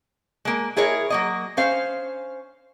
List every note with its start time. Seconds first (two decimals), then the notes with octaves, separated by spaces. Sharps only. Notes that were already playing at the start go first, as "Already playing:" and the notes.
0.45 G#3 A#3
0.76 E4 G#4 A#4 C#5 D#5
1.10 F#3 A#3 D#5
1.57 C#4 C5 F5